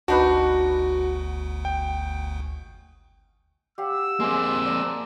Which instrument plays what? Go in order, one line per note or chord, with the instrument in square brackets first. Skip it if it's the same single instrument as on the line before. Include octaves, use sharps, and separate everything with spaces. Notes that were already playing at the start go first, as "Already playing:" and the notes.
[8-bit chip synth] G1 D2 [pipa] D4 D#4 B4 [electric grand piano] F#4
[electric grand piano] G5
[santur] G4 F5 F#5 [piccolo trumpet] E6
[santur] G#3 C5 D6 [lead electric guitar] A#3 C4
[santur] D5 A5 A#5